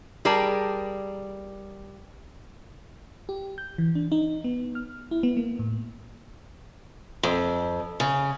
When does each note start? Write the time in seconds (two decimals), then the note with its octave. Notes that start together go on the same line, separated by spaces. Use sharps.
0.25 G3 G#4 A#4 D5 A5
3.29 G4
3.58 G6
3.78 E3
3.95 D4
4.12 D#4
4.44 B3
4.75 F6
5.11 E4
5.23 B3
5.37 A#3
5.59 A2
7.23 F2
8.00 C#3